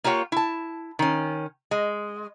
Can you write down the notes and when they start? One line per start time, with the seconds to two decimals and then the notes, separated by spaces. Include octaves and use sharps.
0.04 A#3 F4 G4 C#5 F#5
0.32 E4 A5
0.99 D#3 C#4
1.71 G#3